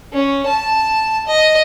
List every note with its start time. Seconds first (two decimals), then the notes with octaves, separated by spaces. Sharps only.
0.13 C#4
0.47 A5
1.27 D#5